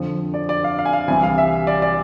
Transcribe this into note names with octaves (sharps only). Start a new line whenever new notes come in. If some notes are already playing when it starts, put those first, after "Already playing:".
Already playing: F2 D3 F3
D5
D5
F5
F5
G#5
F5
C2 C3 E3 G#5
F5
E5
D5
D5